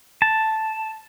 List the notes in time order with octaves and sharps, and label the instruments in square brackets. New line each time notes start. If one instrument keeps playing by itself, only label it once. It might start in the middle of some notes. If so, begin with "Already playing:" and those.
[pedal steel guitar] A5